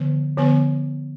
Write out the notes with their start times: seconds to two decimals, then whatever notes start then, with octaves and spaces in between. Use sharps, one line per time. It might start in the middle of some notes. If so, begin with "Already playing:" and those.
Already playing: D3 F3 B3
0.37 D3 F3 B3